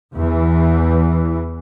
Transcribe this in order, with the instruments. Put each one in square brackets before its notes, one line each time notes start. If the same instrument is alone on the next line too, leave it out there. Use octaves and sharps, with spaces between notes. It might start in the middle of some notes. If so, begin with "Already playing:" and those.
[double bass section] E2 E3